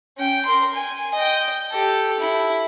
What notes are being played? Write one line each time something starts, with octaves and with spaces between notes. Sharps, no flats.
C#4 G5
A#4 C6
G#5
D#5 G5
G4 A4
E4